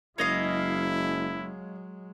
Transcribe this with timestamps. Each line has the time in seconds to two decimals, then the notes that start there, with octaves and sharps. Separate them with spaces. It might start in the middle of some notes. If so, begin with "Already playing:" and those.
0.18 F#1 F#3 G#3 C#4 E4 D#5 F5